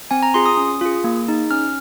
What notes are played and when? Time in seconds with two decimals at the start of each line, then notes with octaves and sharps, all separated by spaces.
0.11 C4 G#5
0.23 A#5
0.34 F4 G#4 C6
0.46 D#6
0.57 C#4
0.81 F4 G#4
1.04 A#3
1.28 D#4 G#4
1.51 C#4 F6